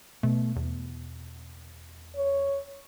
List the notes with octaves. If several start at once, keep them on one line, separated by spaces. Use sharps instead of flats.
B2 A3
E2
C#5